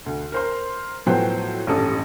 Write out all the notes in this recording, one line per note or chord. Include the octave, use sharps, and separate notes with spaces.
D2
A#4 C5 C6
A2 F3 F#3 B3 C5 G5
D#1 A1 G2 G4 A4 D#6